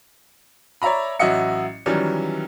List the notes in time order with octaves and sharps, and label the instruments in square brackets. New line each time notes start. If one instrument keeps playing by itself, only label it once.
[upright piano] C#5 D5 E5 A#5 B5
A1 F#3 F#4 D#5 E5 C#7
D#3 E3 F#3 G3 C#4